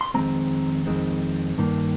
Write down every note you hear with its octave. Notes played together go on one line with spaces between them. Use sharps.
C6
F2 D#3 G#3 C4 A#5
F2 D#3 G#3 C4
G2 D#3 A#3